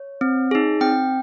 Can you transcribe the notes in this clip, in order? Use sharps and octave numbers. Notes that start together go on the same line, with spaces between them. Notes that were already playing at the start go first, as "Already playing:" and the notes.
Already playing: C#5
C4
D#4 G#4
C4 G5